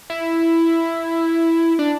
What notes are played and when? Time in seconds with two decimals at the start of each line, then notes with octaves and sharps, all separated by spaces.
0.10 E4
1.79 D4